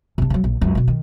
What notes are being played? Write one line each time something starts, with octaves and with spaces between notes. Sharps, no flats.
C3 D4
C#3 F#3
A#1
C#2 F#2
B2 D#3
D#3